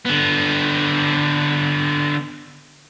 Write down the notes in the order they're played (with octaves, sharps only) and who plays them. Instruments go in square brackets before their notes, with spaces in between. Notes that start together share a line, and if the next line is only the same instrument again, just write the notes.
[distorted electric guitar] D3 B3